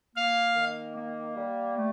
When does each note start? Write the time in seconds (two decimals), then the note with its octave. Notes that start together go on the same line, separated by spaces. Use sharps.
0.16 A#3 F5
0.56 D#3
0.96 A#3
1.36 G3
1.77 A3